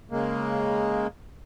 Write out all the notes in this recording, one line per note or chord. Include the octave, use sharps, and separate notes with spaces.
C#3 G#3 A#3